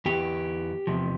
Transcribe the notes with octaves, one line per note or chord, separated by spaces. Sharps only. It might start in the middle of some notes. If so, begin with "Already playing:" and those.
E2 E3 G4
E2 C3 F3